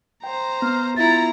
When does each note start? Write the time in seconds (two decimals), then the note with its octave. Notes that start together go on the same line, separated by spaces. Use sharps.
0.24 C5 G5 A#5
0.62 B3 F6
0.97 E4 F4 A#5 A6